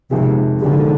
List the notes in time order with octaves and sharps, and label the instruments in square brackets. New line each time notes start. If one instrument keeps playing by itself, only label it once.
[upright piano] F2 D#3 G#3 [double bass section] C3
[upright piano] F2 D#3 G#3 [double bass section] D3